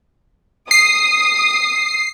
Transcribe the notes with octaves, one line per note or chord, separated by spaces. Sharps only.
D#6 C7